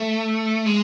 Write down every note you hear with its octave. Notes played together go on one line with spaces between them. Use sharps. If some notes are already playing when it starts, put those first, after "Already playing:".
Already playing: A3
G#3